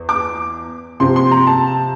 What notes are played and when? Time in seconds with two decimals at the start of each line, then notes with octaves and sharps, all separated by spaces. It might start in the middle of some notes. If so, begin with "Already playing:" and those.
Already playing: E2
0.09 D6
1.00 C3 F3 C4 C6
1.16 C6
1.31 A#5
1.47 A5